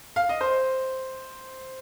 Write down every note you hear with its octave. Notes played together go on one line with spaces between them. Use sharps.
F5
D#5
C5